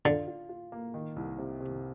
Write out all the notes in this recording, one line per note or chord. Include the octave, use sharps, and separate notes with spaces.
D3 F4
F4
F4
A#3
D#3
C2
C3
C3